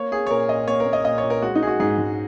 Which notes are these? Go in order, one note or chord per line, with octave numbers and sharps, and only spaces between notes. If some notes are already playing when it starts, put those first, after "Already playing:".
Already playing: A#3 C#5
A#3 G#4
C#5
A#2 A#4
A#2 D#5
A#3 C#5
A#4
A#3
D#5
A#2 D#5
C#5
A#2
A#4
G#3 F#4
D#4
G#3 G#4
F#4
G#2 G#4
G#2